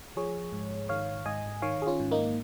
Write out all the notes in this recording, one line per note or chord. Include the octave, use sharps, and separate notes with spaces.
F3 G#4 C#5
G#2
D#3 C#5 F5
G#2 D#5 G#5
D#3 C#5 F5
G#4
C#4 F4
G#2
A#3 D#4